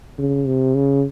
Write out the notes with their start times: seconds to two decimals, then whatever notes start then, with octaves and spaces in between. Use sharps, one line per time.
0.18 C#3
0.47 C3
0.75 C#3